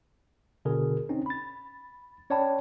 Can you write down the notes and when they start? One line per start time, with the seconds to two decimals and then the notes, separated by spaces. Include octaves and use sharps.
0.65 B2 D3 G#4 A#4
1.09 C4 C#4 D#4
1.26 B5 A6
2.30 C#4 C#5 D5 G5 A5 B5